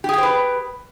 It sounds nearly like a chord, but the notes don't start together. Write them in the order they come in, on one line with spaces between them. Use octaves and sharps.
G4 G#4 G5 C5 B4